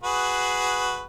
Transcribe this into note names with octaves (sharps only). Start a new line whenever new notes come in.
F#4 G#4 B4